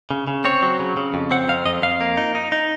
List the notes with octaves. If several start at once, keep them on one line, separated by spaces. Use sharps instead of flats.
C#3
C#3
C4 C#5
F#3
C#3
C#3
F2
C4 F#5
F2 F5
F2 D#5
F2 F5
A#3
D#4
D#4
D#4